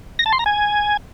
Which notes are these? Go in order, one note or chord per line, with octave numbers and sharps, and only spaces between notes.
A#6
A5
C6
A#5
G#5